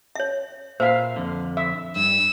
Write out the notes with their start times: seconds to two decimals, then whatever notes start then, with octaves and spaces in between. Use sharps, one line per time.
0.15 C#5 E5
0.80 A#2 C5 E5 F5
1.16 F2 D3
1.57 E5
1.96 G2 E6